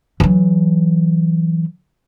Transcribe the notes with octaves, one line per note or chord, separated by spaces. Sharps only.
E3 F#3